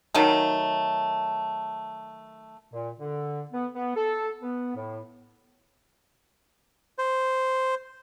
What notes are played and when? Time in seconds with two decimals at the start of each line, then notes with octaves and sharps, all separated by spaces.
0.14 D#3 F#3 A3
2.72 A#2
2.99 D3
3.53 B3
3.74 B3
3.96 A4
4.41 B3
4.75 A2
6.98 C5